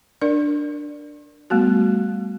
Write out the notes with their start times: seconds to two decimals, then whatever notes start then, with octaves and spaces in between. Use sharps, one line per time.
0.22 D4 A#4 D5
1.50 G3 A3 B3 F#4